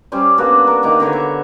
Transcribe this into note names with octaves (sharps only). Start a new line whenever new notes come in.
G3 C#4 C5 D5
A#3 B3 D4 F#4
A#4
D#3 A#3
D3 B3 C#5
E5